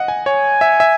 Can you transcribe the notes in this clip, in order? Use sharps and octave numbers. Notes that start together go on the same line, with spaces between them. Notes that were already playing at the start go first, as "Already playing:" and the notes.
Already playing: D#5 F#5
G#5
C#5 G#5
E5
E5